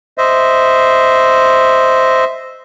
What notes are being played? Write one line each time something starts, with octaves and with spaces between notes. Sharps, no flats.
C5 D#5 E5